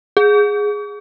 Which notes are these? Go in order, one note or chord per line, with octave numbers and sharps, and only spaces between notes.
G#4